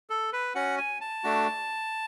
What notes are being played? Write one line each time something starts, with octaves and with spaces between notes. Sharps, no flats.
A4
B4
C#4 F#4 F#5
G#5
A5
A3 D4 F#4